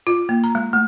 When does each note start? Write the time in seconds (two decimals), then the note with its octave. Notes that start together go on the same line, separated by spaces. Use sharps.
0.07 F4
0.29 A#3
0.44 A#5
0.55 G#3
0.73 A3